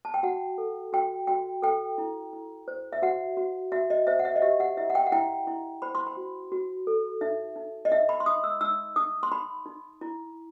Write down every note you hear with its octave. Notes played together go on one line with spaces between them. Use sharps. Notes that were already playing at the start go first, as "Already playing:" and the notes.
A5
G5
F#4 F#5
A4
F#4 G5
F#4 G5
A4 G5
E4
E4
C5
E5
F#4 F#5
F#4
F#4 E5
D#5
C5 E5
F#5
E5
D#5
G4 E5
F#5
E4 E5
F#5
G5
F#5
E4 G5
E4
C5 B5
C6
B5
F#4
F#4
A4
D#4 E5
D#4
D#5
D#4 E5
B5
C6
D#4 D#6
E6
D#4 E6
D#4 D#6
C6
D#4 B5
D#4
E4